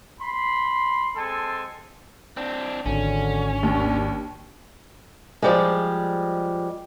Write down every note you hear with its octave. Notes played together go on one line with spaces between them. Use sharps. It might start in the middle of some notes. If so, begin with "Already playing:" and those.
B5 C6
G#3 C4 A4 G#5 A5 C6
C4 D4
G#1 D3 C#4
D#2 D4
F3 G3 G#3